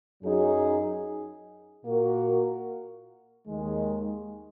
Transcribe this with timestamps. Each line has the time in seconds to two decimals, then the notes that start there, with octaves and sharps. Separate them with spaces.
0.23 F#2 F#3 D#4 G#4
1.84 A#2 A#3 F#4 A#4
3.46 D#2 D#3 G#3